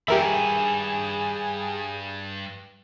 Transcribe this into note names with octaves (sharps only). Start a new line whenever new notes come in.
E2 G2 G4 G#4 A#4 E5 G#5 B5